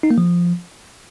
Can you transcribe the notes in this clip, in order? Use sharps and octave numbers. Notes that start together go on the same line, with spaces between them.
D#4
A#3
F3